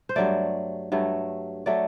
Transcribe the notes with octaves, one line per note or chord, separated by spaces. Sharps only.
C5
G2 F#3 A3 D5
G2 F#3 A3
F#3 A3 D5